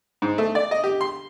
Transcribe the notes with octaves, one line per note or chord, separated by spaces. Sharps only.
G#2
A3
D5
D#5
G4
C6